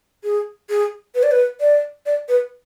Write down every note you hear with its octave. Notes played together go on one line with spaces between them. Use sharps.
G#4
G#4
B4
D5
B4
D5
D5
B4